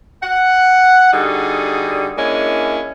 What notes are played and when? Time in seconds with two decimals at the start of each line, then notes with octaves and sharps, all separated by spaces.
0.22 F#5
1.13 D3 G3 D#4 F#4 G#4
2.16 G#3 A#3 C#4 D4 E4